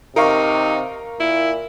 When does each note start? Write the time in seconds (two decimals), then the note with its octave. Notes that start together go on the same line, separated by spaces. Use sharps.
0.16 C3 D#4 A#4 F5 C#6
1.20 A#2 E4